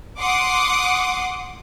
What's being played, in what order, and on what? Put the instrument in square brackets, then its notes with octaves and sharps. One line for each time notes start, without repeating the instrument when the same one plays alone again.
[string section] F#5 C6 D6 D#6